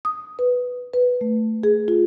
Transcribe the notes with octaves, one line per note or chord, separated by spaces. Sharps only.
D#6
B4
B4
A3
G#4
F4